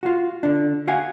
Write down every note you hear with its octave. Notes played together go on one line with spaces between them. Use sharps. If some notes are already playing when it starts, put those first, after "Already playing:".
F4 F#4
D3 D4
F#4 F5 F#5 G#5